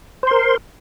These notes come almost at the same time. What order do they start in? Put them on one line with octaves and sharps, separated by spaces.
C5 C6 A#4